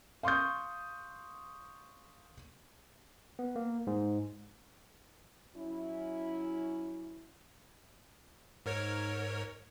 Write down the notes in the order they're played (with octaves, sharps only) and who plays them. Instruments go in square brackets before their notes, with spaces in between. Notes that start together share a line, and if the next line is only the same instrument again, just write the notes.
[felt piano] F5 C6 C#6 D#6 G6
[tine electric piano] B3
A#3
G#2
[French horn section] F#3 C#4 E4
[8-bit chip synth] G#2 A#4 C#5